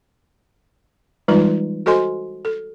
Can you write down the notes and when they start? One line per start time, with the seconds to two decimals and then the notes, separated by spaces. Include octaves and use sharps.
1.28 E3 G3 G#3 D#4 F4 B4
1.86 F#4 A4 C5 D#5 G#5 C6
2.45 A4